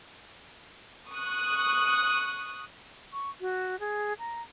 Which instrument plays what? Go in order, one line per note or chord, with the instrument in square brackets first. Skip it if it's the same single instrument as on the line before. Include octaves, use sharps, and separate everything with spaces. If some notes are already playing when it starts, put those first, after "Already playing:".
[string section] C#6 D#6 F#6
[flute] C#6
F#4
G#4
A#5